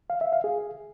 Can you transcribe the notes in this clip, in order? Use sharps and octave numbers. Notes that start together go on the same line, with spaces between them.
F5
E5
F5
G#4